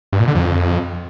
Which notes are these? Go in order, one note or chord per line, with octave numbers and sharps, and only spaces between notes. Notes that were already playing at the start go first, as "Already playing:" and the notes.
G2
A#2
D3
F2